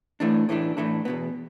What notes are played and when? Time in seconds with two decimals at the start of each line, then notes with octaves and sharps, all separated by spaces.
0.20 A2 E3 A3 D4
0.49 A2 E3 A3 D4
0.77 A2 E3 A3 D4
1.05 E2 B2 B3